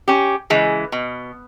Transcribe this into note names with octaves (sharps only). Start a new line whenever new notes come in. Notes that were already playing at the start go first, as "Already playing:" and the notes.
C#4 G4
C#3 E3 G#3
B2